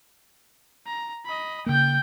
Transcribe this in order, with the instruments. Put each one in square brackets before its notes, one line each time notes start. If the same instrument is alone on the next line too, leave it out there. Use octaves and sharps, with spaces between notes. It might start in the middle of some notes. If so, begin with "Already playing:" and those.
[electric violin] A#5
D#5 B5
[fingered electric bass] C#3 A#3 [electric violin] G5 G6